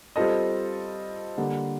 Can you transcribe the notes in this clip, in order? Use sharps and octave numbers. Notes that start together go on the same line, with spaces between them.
G3 C4 F4 A4 D#5
D3 G3 A#3